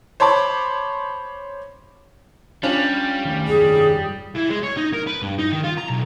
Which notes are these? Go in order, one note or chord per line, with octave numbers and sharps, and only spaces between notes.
C5 C#5 A5 B5 D6
G3 C#4 D4 F4
D#3 F3 A3
F1 G2 D#3 G#4
E3
G#3
C#5
D#4
A#4
B4
G2
D#4
D#3
F4
A#5
B1